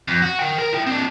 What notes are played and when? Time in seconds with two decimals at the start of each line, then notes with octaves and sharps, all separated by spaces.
0.08 F2
0.22 F#4
0.40 A#4 G5
0.59 A#4
0.73 E4 G5
0.87 C4 D4